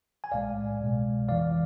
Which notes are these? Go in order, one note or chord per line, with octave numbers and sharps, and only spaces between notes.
G#5
B1 A2 G#3 D5 F5
C2 B2 G#3
F2 C3 E3 D5 F5